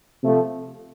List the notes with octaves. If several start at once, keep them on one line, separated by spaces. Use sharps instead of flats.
C3 F3 A3